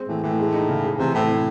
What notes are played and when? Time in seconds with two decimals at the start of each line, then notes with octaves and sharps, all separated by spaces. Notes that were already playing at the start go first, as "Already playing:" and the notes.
Already playing: G#3 C4
0.08 A2 E3
0.23 A2 E3
0.39 G#3
0.54 D#4
0.69 C#3
0.84 G#4
0.99 C3 E3
1.14 A2 C4
1.29 C3